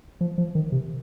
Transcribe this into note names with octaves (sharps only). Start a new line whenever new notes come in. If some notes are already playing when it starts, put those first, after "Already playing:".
F3
F3
D#3
C3